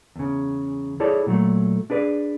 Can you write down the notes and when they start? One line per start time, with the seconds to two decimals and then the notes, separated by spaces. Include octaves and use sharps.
0.16 E2 C#3
1.00 E4 G#4 A4 C#5 D5
1.26 A#2 F#3 A3
1.90 D4 G#4 B4 D5